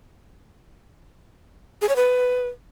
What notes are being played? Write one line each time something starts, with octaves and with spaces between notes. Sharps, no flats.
G#4
C#5
B4